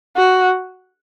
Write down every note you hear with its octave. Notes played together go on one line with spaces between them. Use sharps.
F#4